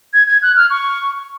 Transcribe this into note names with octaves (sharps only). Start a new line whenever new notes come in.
G#6
G#6
F#6
F6
C#6